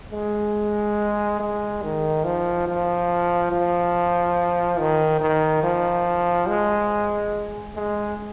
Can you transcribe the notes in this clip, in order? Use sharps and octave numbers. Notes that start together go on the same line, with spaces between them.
G#3
G#3
D#3
F3
F3
F3
D#3
D#3
F3
G#3
G#3